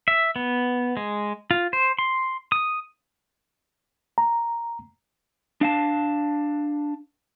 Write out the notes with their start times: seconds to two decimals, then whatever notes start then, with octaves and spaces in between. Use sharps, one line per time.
0.08 E5
0.36 B3
0.97 G#3
1.51 F4
1.73 C5
1.99 C6
2.52 D#6
4.18 A#5
5.61 D4 F5 A5